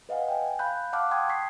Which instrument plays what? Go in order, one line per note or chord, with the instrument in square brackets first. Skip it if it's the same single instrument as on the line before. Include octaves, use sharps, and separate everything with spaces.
[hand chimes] B4 D#5 F5 F#5 G#5
G5 G#5
F5 B5 F#6 G6
F5 F#5 A5 D6 F6 F#6
G5 A5 C6 D#6 G#6
C#6 D#6 B6 C7